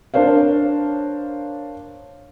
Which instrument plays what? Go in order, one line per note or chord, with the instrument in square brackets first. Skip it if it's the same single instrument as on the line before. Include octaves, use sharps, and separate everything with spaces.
[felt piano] D4 A#4 C5 C#5 F5